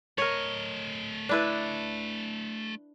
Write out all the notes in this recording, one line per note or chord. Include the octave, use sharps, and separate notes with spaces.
A3 A#4 C#5 D#5
D4 E4 B4